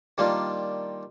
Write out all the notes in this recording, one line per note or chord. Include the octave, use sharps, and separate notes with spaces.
D#3 G3 A#3 D4 F4